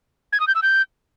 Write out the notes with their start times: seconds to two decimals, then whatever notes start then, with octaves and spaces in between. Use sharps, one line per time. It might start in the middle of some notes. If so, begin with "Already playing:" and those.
0.33 G#6
0.40 D#6
0.47 G6
0.55 E6
0.62 G6